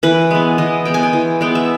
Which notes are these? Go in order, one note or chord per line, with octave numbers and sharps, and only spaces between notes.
E3 B4
G#3 B3
E3 D#5
G#3 B3 G5
G#5
G5
E3
G#3 B3 G5
E5